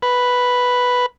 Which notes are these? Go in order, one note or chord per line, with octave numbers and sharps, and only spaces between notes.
B4